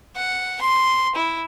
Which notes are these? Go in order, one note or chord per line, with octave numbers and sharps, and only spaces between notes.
F#5
C6
E4